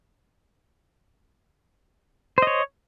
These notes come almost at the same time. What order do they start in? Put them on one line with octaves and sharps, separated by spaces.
C5 D#5 C#5